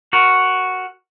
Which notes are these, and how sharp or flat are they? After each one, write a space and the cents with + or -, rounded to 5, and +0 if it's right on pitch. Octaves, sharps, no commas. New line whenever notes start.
F#4 +0 A#4 +0